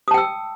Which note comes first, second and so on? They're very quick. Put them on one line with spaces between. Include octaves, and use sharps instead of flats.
D#6 A5 G5 E6